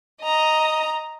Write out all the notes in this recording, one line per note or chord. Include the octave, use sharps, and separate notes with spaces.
D#5 A#5